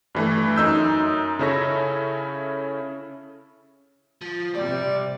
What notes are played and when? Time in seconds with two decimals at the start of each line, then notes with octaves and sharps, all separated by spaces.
0.15 G2 E3 A3
0.56 F#2 D#4 E6 G6
1.39 C#3 C#4 E4 A4 C#5 A#6
4.21 F3
4.55 C3 G3 D5